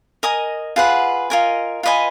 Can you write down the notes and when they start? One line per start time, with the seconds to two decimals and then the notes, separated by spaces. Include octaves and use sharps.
0.23 A#4 D#5 G#5 D#6
0.76 F4 G#4 B4 F#5
1.30 F4 A#4 D#5 G#5
1.83 F4 B4 D#5 G#5